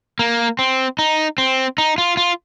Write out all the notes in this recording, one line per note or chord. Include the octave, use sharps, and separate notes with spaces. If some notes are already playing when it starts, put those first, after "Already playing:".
A#3
C4
D#4
C4
D#4
F4
F4